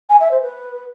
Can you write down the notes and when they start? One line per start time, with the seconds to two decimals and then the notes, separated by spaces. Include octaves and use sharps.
0.10 G#5
0.20 E5
0.31 C5
0.42 B4